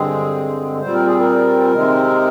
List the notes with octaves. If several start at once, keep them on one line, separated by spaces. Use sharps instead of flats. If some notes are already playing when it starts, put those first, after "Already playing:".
Already playing: G2 D3 G#3 C4 G#4
A#2 G3 C4 C5
A#4
G#4
A#4
C3 D#3 G#3 C4